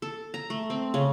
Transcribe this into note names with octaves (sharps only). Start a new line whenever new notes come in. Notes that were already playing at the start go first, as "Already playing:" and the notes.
A4
A#5
A3
C4
C#3